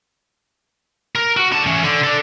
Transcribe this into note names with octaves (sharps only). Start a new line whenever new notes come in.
A#4
F#4
D3 A5
E3 C#4
D3
D4 A4